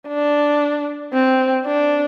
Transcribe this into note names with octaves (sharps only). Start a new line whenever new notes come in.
D4
C4
D4